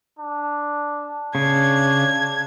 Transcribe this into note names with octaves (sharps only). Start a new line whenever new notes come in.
D4
C#3 D4 G#6